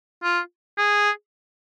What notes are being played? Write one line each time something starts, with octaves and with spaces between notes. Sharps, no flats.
F4
G#4